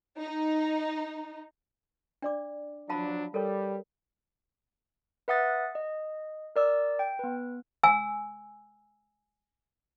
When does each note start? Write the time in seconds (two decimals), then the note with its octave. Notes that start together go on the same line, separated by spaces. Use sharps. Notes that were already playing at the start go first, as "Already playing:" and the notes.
0.19 D#4
2.22 D4 D5 D6
2.89 F3 F#3 D4 F5 A5 B5
3.34 G3 A4 A#4 C#5
5.28 B4 E5 F#5 D#6 A6
5.75 D#5
6.56 A#4 D5 E6
6.99 G5
7.19 B3 B4
7.83 G#5 E6